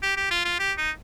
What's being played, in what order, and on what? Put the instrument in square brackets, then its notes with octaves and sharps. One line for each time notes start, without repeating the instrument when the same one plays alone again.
[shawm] G4
G4
F4
F4
G4
D#4